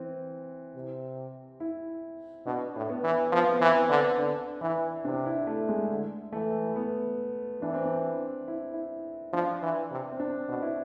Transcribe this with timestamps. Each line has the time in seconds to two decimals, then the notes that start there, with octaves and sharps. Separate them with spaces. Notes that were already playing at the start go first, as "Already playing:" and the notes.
Already playing: E3 C4
0.75 C3
1.60 E4
2.46 B2 D4
2.76 A2
2.90 B3
3.04 E3
3.32 F3 B3
3.42 C4
3.53 B3
3.62 E3
3.76 C4
3.90 D3
4.18 D3 D4
4.61 E3 E4
5.05 C3 D4
5.26 E4
5.47 A3
5.69 G#3
5.91 D3
6.33 E3 A3
6.76 B3
7.61 E3 D4
7.74 C4
7.85 D4
8.48 E4
8.74 E4
9.33 F3 D4
9.62 E3
9.91 C3
10.12 C4
10.20 D4
10.49 B2
10.62 E4